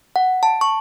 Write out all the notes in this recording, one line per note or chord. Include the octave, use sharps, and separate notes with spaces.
F#5
A5
C#6